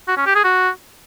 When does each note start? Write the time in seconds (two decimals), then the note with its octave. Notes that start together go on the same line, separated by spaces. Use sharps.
0.08 F#4
0.17 C#4
0.26 G4
0.35 G#4
0.44 F#4